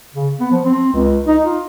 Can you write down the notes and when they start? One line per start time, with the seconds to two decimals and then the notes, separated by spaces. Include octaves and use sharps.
0.14 C#3
0.40 B3
0.51 F3
0.66 C4
0.93 C#2
1.27 D#4
1.45 F4